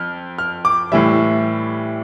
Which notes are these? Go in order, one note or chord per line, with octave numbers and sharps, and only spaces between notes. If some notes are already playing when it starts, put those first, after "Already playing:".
Already playing: F2 F6
F6
D6
A2 E3 G3 E5